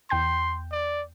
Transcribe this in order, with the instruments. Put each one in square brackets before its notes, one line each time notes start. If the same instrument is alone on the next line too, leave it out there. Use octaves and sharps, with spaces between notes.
[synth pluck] E2 G5 G6 [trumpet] C6
[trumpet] D5